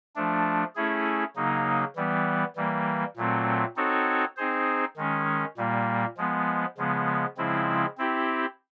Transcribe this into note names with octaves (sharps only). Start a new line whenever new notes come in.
F3 A3 D4
A3 C#4 E4 G#4
C#3 F#3 A#3 D#4
E3 G3 B3
E3 G3 A#3
A#2 F#3 A3 C4
C4 D#4 F#4 A4 C#5
C4 D#4 G#4 C5
D#3 G#3 C#4
A#2 G3 A#3
F3 G#3 B3
C#3 F3 G#3 B3
C#3 F3 G#3 C4 E4
C4 E4 G4